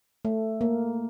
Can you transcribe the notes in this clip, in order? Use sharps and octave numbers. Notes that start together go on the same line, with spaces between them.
A3
A#3